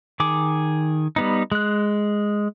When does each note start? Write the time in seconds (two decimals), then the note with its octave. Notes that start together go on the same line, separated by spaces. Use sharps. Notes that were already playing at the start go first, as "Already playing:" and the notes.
0.20 D#3 G#4 D6
1.16 G3 B3 D#4
1.52 G#3 F#6